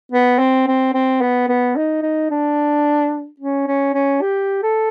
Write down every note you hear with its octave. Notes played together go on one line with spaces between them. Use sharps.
B3
C4
C4
C4
B3
B3
D#4
D#4
D4
C#4
C#4
C#4
G4
A4